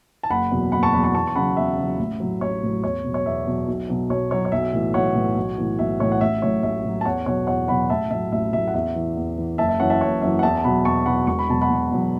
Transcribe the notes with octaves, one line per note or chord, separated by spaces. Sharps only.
A5
F#1 F#5 B5
E2 B2 F#3
F#1 F#5 B5
A5 C#6
E2 B2 F#3 F#5 B5
A5 C#6
E2 A5 C#6
C#6
C#3 F#3 F#5 B5
E2 E5
C#3 F#3
A1
A2 F#3
A1 C#5
A2 F#3
E2 C#5
B2 F#3
C#5
E2 E5
B2 F#3
B1
B2 F#3
B1 C#5
B2 F#3 C#5
C#5
B1 E5
A2 E3
B1 C#5 F#5
A2 E3
B1
A2 E3
B1 E5
A2 E3 C#5
F#5
A1 E5
A2 F#3 C#5
A1 E5
A2 F#3
A5
E2 C#5 F#5
B2 F#3 C#5 F#5
E2 C#5 F#5
B2 F#3 F#5 B5
A1 E5 A5
A2 F#3 E5
A1 E5
A2 F#3 E5
F#5
E2 E5
E3
E2
E3
F#1 E5 A5
E5
F#2 E3 C#5 F#5
E5 A5
F#1 C#5 F#5
F#2 E3 E5
F#5
E2 E5 A5
A5
B2 F#3 F#5 B5
E2 A5 C#6
B2 F#3 F#5 B5
E1 C#6
B5
E2 B2 F#3 A5
F#5 B5
E1
E2 B2 F#3